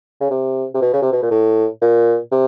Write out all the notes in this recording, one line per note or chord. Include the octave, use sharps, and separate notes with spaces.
C#3
C3
C3
B2
C#3
C3
B2
A#2
A2
A#2
C3